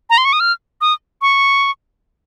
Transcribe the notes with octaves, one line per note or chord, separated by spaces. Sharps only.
A#5
C6
C#6
D#6
F6
D#6
C#6